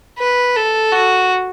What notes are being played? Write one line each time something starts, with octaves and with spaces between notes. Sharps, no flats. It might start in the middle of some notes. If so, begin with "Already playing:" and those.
B4
A4
F#4